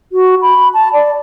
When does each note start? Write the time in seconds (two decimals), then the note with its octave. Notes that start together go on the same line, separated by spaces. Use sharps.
0.13 F#4
0.42 B5
0.74 A5
0.93 D5